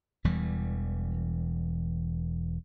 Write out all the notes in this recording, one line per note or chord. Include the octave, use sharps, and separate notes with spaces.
E1 E2 E3 G3